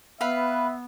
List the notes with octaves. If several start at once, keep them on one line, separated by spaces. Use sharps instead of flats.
B3 B4 E5 F5 B5